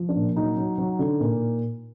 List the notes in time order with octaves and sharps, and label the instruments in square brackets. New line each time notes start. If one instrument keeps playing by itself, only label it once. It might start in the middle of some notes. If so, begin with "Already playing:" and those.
Already playing: [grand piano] F3
D4
A#2
F#3 D#4
F#3
F#3
D3
A#2